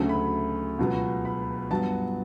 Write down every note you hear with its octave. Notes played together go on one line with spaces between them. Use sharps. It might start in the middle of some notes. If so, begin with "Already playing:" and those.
Already playing: D2 C#3 F#3 A3 A5
B5
C#2 B2 F#3 B3
B5
G2 F#3 B3 A5